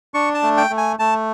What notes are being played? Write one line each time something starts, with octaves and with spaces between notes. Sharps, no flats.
D4 C#6
A5
A3
G5
A3
G#5
A3 A5